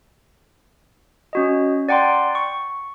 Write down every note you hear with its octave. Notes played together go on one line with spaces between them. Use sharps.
C#4 F#4 D#5
D5 F#5 G5 A#5 C6
C#6